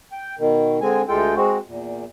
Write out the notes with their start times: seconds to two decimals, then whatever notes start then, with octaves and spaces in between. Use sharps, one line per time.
0.12 G5
0.39 B2 D#3
0.81 D3 G#3 C4 G#5
1.08 D2 G#3 F4 A4 G5
1.36 G#3 C4 F#4
1.67 E2 A#2